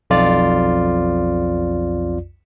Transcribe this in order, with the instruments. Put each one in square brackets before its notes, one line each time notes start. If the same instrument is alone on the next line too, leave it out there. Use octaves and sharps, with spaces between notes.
[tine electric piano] B1 F2 F4 D5